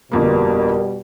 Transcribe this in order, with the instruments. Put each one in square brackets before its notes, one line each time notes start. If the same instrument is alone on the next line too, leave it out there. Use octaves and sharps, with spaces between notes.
[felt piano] G1 F2 A#3 [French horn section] B2 G3 [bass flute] A#4